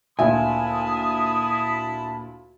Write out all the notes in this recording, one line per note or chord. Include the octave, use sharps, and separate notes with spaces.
D2 A#2 E4 E5 G#5 A5 B5 D#6